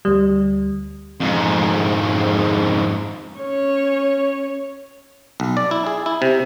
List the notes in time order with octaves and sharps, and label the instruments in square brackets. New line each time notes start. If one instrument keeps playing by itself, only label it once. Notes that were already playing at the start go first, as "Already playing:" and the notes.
[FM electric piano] D2 G3
[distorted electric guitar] F2 G#2
[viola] C#4 C#5
[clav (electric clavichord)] B1
D5
E4
G#4
E4
C3